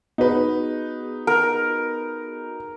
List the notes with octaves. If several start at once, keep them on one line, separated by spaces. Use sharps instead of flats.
B3 D#4 F#4 G#4 B4
A#4